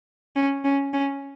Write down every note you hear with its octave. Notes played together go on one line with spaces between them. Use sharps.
C#4
C#4
C#4